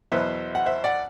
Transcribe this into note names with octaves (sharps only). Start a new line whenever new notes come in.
E2 B2 F#3 B3 C5 E5
F#5
C5 E5
D5 F#5